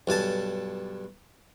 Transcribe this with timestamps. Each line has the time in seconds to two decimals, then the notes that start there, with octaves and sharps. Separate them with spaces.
0.07 B1 G2 G#5 A5